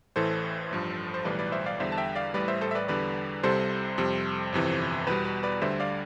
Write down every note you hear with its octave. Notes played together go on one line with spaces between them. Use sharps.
A1 A2 E3 A4 C5
A1 G2 F3
C5
B1 A2 E3 G3 B4 D5
B4 D5
C5 E5
D5 F5
E2 D3 G3 C5 E5
A5
E5 G5
D5 F5
A1 A2 G3 B4 D5
C5 E5
A4 C5
E5
B4 D5
E2 D3 G3 B4 D5
C2 C3 G3 A4 C5
F2 C3 G3
G1 F2 C3 E3
E2 B2 G3 B4
B4
B4 D5
D2 D3 G3 C5 E5
D5 F5